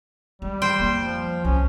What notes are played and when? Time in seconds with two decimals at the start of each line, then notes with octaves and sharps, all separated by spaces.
0.42 G3 G#3
0.62 C5 G5
0.80 F2 A#3
1.05 F3
1.45 C2 C#4